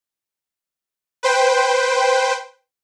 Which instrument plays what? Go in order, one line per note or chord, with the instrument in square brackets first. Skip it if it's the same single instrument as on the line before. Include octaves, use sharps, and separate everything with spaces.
[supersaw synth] B4 C5 G5